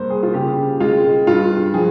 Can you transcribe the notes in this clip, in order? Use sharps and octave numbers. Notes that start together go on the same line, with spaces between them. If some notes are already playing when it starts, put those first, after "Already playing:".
Already playing: G2 A#3 C5
G#4
F4
C#3 G4
G#3 F4
G2 F4
F3 G#4